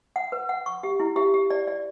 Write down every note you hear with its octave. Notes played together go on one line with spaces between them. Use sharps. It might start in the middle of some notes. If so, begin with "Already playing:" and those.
F#5
B4
F#5
C#6
G4
E4
G4
G4
D5
D5